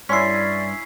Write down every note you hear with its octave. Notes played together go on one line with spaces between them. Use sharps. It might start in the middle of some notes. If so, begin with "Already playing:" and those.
G2 C#4 E4 D5 C6 B6 C7